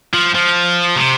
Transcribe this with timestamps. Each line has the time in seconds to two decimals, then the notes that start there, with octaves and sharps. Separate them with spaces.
0.14 F3
0.34 F3
0.96 C3